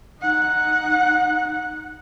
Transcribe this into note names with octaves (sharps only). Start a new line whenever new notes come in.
D#4 F#5